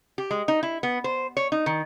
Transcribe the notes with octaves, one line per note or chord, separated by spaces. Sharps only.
G4
G#3
D#4
E4
B3
C5
C#5
D#4
D#3